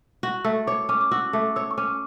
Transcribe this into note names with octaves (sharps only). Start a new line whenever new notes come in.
F#4
A3 E6
C#5 D6
C#4 D6
D6
F#4 E6
A3 D6
C#5 E6
C#6
C#4 D6